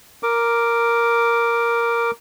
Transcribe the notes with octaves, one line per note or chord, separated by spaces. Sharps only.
A#4 D6